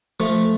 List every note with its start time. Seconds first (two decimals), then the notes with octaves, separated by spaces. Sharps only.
0.20 F3 A3